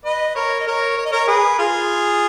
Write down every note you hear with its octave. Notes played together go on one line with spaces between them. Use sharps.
B4 D#5
A#4 C#5
D#5
A#4 C#5
C#5
D#5
A#4 C#5
G#4 B4
F4 G#4